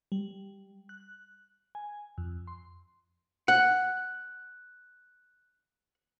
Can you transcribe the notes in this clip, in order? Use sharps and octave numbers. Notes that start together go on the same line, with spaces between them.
G3
F#6
G#5
F2
C6
F#5 F#6